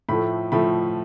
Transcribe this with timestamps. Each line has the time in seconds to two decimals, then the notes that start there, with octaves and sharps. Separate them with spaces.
0.09 A2 F3 A3 B5
0.52 A2 F3 A3 B5